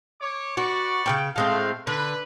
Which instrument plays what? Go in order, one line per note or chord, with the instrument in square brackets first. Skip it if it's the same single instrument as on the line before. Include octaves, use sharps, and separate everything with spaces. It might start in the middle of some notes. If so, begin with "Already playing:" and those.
[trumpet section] C#5 D6
[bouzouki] F#4 [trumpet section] B4 D5 C#6
[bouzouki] C#3 A#3 G5
[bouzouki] A2 G#3 C4 [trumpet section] A3 F5
[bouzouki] D3 [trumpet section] B4